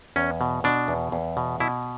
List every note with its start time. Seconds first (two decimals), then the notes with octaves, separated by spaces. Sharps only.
0.16 E2 C#4
0.41 B2
0.64 B2 D4
0.88 E2
1.12 E2
1.37 B2
1.60 B2 E4